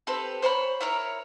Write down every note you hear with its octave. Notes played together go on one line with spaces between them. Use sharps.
C4 G4 A4 B4
C5 C#5 A5 B5
E4 A#4 C#5